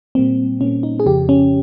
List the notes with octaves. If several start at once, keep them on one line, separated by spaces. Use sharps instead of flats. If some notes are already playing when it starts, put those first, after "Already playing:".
A#2 G3 A#3 C4
A#2 G3 A#3 C#4
D#4
G#4
F2 C#3 F3 G4
C#4